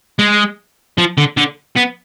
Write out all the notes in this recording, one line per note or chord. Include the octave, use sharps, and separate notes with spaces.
G#3
F3
D3
D3
B3